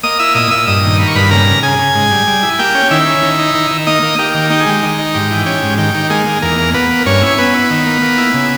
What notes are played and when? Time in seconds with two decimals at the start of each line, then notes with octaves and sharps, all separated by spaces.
0.03 A#3 D#5 D#6
0.19 E4 E5 E6
0.35 A#2 D#5 D#6
0.51 A#2 E5 E6
0.67 G2 D#5 D#6
0.84 D#3
0.99 A#3 B5
1.08 C#6
1.15 G2 B4 B5
1.31 C#3 A#4 A#5
1.47 C#3
1.63 C#3 G#4 G#5
1.79 C#3
1.95 G#2
2.11 G3
2.27 G3
2.43 E4
2.59 A#3 G4 G5
2.75 C#4
2.91 D#3 E4 E5
3.07 C#4
3.23 D#3
3.39 D#4
3.55 D#3
3.70 D#3
3.87 A#3 D#4 D#5
4.03 A#3
4.19 A#3 G4
4.34 D#3
4.50 D#4 G4
4.60 G#4
4.66 G#3 G4
4.83 D#3
4.99 D#4
5.14 G#2 G4
5.31 E3
5.46 C#4 G4
5.63 G#2
5.78 D#3 G4
5.94 D#3
6.10 G#3 A#3 G#4
6.26 A#3
6.42 E2 A#3 A#4
6.58 A#3
6.74 A#3 B3 B4
6.90 A#3
7.06 G2 C#4 C#5
7.22 E4 C#5
7.38 B3 C#4 B4
7.54 E4
7.70 D#3
7.86 A#3
8.02 A#3
8.18 E4
8.34 C#3